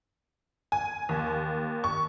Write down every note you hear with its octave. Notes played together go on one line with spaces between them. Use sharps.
G#5
D#2
C#6